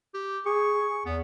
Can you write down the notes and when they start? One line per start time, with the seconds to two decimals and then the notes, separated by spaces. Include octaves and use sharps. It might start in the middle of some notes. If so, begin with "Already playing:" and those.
0.14 G4
0.46 G#4 C#6
1.06 E2 B3